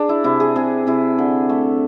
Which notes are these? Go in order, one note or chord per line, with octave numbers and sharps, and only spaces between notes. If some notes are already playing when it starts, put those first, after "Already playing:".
Already playing: D4 G#4
E4
C3 E4
G#4
C3 G#4
C3 E4
D3
A3